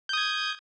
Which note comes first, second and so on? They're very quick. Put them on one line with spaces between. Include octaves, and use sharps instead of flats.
G6 D#6 G#6